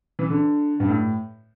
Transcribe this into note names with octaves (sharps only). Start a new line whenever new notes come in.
E3
D3
G2
A2